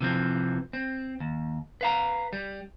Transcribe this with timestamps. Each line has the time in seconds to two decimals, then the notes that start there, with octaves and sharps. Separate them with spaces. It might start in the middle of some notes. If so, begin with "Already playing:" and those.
0.01 C3 E3 F3 C4
0.73 C4
1.20 D#2
1.81 B4 F5 A#5
2.33 G3